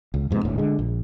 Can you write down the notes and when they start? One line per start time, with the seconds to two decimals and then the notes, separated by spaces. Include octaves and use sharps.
0.14 C#2
0.31 F2 G#2 C3 B3
0.45 D#1 A1 D2 A2
0.58 D3 G#3
0.79 A#1